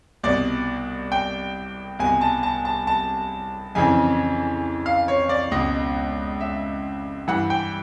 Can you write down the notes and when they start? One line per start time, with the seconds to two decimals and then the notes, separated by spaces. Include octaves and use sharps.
0.23 C2 B2 D5
1.12 G5
1.99 C2 B2 G#5
2.21 A5
2.43 A5
2.65 A5
2.87 A5
3.75 F2 C#3 E3 G#5
4.86 F5
5.08 C#5
5.29 D5
5.51 C#2 B2 D#5
6.40 E5
7.28 G2 E3 F#5
7.50 G5